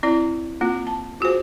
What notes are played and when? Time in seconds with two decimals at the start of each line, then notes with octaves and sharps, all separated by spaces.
0.03 C4 E4 D5
0.61 A#3 C4 F4
0.87 A5
1.20 F4 F#4 G#4 C5